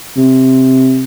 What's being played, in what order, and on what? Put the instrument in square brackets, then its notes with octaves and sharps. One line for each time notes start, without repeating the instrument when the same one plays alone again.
[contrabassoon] C3